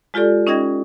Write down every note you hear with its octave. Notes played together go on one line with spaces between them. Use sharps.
G#3 F4 G4 A4 D5
C#4 D#4 D#5 G5 G#6 A#6